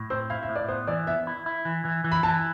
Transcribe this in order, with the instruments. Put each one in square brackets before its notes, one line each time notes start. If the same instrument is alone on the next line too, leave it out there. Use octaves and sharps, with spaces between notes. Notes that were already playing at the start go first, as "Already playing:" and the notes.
Already playing: [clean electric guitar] A2
[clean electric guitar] C4 [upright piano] C5
[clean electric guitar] E4 [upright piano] F5
[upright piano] E5
[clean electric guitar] A2
[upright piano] D5
[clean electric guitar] B3 [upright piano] C5
[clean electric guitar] E3 [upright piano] D5
[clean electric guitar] B3 [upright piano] E5
[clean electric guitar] E4
E4
E3
E3
E3
[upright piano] B5
[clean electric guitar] E3 [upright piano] A5